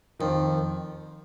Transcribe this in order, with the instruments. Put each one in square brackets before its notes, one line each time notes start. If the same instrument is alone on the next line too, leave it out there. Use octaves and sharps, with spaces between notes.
[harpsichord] F2 [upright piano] D#3